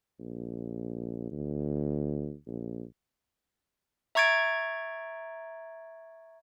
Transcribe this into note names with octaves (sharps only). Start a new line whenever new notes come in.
A#1
D2
A#1
E5 A#5 C#6 G#6 A6 D7